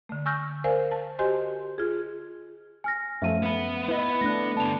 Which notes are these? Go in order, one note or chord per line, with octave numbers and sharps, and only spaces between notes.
D3 A3
G#5 C#6 E6 F6 G6 A#6
A#4 C5 D5 F5 G#5
A5
F#4 G4 C5 D#5 G#5 C6
F4 G#4
G#5 F6 A#6
F#2 F3 A3 E5 F5 D#7
B3 B5
E4 B4 D#5
A3 D4 F#6 A#6
D3 B3 A5 F7